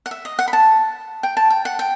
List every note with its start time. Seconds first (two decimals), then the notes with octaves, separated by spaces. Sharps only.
0.06 F#5
0.11 E5
0.25 D#5
0.39 F#5
0.48 B5
0.53 A5
1.23 G5
1.37 A5
1.50 G5
1.65 F#5
1.79 G5